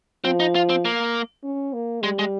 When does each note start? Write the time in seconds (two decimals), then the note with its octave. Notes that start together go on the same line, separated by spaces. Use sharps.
0.25 F3 C4
0.40 D#4
0.55 F4
0.70 C4
0.85 A#3
1.44 C#4
1.73 A#3
2.03 G3 G#3
2.19 G#3